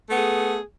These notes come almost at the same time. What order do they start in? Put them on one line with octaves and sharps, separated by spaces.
A3 B3 G#4